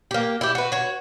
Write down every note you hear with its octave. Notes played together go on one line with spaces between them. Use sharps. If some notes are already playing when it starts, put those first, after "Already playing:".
A#3 G4
E4 G4
F#4 B4
F#4 C#5